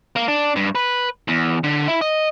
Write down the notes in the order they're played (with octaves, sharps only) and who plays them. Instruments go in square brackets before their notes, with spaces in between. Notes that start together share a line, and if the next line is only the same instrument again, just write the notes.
[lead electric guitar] A#3
D4
G2
B4
E2
D3
E4
D#5